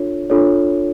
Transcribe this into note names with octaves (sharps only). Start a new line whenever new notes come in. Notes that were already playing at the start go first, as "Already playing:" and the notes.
Already playing: D4 F4 A4 C#5
D4 F4 A4 C#5